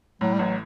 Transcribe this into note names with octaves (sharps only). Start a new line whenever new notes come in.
A2 F#3
G3
A1 F#3